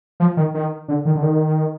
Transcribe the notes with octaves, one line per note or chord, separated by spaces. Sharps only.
F3
D#3
D#3
D3
D#3
D3
D#3